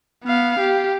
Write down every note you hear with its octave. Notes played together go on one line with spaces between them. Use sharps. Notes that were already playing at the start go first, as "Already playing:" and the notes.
B3 F5
G4